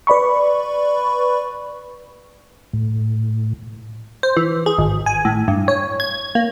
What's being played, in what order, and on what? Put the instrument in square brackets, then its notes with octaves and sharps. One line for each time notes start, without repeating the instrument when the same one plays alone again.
[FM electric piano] B4 D5 B5 C#6
[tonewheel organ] A2
[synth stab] C5
E3
G#4
G#1
G#5
A2
G2
C#5
G#6
A#3